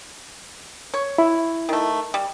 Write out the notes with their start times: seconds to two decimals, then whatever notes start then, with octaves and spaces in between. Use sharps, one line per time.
0.94 C#5
1.18 E4
1.69 D#3 A3
2.14 G3